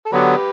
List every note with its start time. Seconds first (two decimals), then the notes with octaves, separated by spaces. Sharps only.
0.06 A4
0.12 D3 F#3 B3 G4 B4